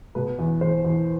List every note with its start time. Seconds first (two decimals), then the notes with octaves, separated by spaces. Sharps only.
0.15 B2 B4
0.39 E2
0.61 E2 C5
0.84 E2